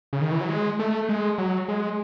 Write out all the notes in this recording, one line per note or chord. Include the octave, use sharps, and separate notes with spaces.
C#3
D#3
E3
F#3
G#3
A3
G#3
F#3
G#3